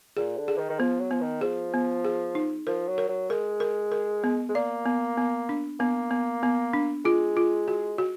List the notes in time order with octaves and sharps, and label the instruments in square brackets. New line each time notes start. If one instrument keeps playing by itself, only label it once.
[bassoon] A#2 [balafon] G#4
[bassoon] D3
[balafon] G#4
[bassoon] D#3
D#3
[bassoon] F3 [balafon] B3
[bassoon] F#3
[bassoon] F3 [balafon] B3
[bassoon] D#3
[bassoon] F3 [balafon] G#4
[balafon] B3
G#4
D#4
[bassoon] F3 [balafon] A#4
[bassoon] F#3
[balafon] A#4
[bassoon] F#3
[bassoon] G#3 [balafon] A#4
[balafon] A#4
A#4
B3
[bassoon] G#3
[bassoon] A#3 [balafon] D5
[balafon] B3
B3
D4
[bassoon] A#3 [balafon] B3
[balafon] B3
B3
D4
[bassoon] G#3 [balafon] F4
[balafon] F4
F#4
F#4